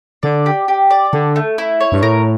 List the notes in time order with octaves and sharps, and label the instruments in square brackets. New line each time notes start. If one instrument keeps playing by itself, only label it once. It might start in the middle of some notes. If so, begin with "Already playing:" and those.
[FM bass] D3 [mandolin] D5
[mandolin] G4
G4
D5
[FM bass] D3 [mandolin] A4
[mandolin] A3
E4
C#5
[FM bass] G2
[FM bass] A2 [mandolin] A#4